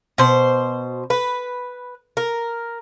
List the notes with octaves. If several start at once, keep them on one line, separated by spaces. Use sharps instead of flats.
B2 C5
B4
A#4